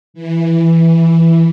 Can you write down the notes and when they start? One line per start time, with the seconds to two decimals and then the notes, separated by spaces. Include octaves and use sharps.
0.14 E3